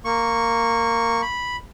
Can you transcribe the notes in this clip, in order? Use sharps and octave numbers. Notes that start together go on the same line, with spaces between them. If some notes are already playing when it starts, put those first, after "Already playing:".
A#3 C#6
B5